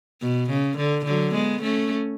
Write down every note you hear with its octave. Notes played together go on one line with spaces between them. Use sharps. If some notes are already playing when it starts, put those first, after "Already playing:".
B2
C#3
D3
D3 F#3
G#3 B3
A3 C#4